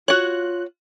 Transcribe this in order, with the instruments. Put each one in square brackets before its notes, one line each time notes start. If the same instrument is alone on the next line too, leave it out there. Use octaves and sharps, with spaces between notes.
[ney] F4 [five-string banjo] F#4 C#5 [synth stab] F#6